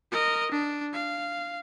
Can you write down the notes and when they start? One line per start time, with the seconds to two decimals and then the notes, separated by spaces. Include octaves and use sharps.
0.12 A#4 D#5
0.52 D4
0.94 F5